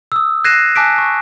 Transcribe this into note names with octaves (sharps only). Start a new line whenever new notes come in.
D#6 E6
F#6 G#6 A#6 C7 D#7 E7
G#5 A5 D6 F#6 B6 D7
C#6